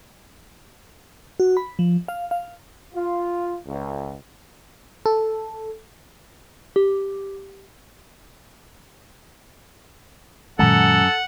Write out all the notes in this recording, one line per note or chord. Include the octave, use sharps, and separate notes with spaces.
F#4
B5
F3
F5
F5
F4
C#2
A4
G4
F#2 A#2 D#3 G#3 A4 F#5